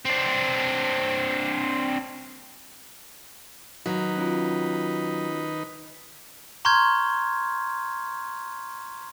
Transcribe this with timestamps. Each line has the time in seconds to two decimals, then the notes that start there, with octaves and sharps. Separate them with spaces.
0.05 C4 D4
3.86 D#3 F#3 D#4 B4
4.17 C#4 F4
6.65 A#5 C6 C#6 F6 G6 G#6